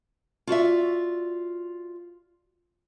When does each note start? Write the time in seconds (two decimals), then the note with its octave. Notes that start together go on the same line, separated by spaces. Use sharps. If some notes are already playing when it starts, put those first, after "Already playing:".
0.47 F4 F#4 D5 E5